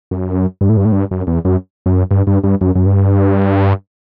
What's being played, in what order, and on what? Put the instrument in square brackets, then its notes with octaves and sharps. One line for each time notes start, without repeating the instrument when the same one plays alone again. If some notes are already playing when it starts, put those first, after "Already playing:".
[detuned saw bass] F#2
G2
A2
G2
A2
G2
F#2
E2
F#2
F#2
G2
G2
G2
F#2
F#2
G2